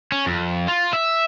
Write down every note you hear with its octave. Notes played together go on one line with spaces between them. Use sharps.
C#4
F2
F4
E5